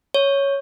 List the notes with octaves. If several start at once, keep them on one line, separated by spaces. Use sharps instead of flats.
C#5